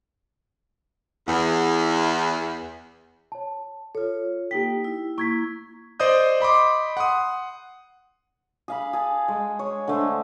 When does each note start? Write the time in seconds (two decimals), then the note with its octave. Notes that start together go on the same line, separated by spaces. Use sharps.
1.27 E2
3.32 C#5 A5
3.95 F4 A4 C#5
4.51 A#3 D#4 G4 G5 B6
4.84 E4
5.18 A#3 E4 C#6 G#6 B6
6.00 C5 D5 D#5 D#6 G6
6.40 D#5 B5 C6 D6
6.97 F#5 C6 D#6
8.68 G#4 F5 B5
8.93 G#4 A5
9.28 G#3
9.59 C#5
9.88 D3 A3 C5